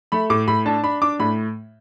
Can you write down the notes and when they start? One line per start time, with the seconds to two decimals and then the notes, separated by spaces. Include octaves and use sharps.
0.12 A3 B5
0.30 A2 D6
0.48 A2 B5
0.65 D4 A5
0.83 D4 B5
1.02 D4 D6
1.20 A2 B5